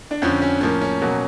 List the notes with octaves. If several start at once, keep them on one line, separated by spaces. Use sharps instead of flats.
D4
F2 D3 F3 C#4
C#4
A2 F3 A#3 C#4
C#4
B2 F#3 A#3